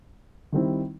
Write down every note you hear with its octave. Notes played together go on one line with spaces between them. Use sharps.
D#3 G3 C4 E4